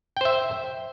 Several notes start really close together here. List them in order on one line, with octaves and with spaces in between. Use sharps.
G5 C5 E5